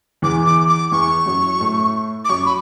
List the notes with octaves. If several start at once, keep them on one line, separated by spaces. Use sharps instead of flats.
E2 E3 D6
D6
D6
E2 E3 C#6
F#2 F#3
A2 A3
D6
F#2 F#3 C#6
B5